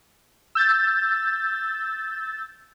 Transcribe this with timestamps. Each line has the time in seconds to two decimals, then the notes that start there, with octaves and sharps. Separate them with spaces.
0.55 E6 G6 A6